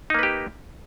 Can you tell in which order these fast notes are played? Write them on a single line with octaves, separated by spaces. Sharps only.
D#4 A#3 B4 G4